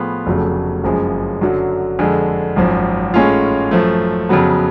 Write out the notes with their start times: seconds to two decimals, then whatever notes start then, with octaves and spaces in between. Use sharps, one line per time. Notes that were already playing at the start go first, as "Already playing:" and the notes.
Already playing: A2 F3 B3 F4 G#4
0.26 F1 F2 C#3 F#3 A3
0.84 F#1 F#2 C#3 F3 G#3
1.41 F#2 D3 F#3
1.99 F2 D3 G#3
2.56 G#1 F#2 F3
3.14 A2 G#3 C#4 F4
3.71 F#2 F3 A3
4.29 F2 C#3 F#3 B3